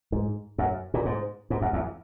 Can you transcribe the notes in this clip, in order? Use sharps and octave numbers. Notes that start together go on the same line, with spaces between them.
G#2
F#2
A#2
G#2
G#2
F#2
E2